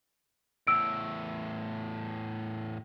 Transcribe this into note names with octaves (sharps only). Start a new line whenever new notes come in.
E2 A2 E6 D7